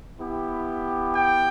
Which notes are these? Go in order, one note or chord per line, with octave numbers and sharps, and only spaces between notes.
B3 E4 G4
G5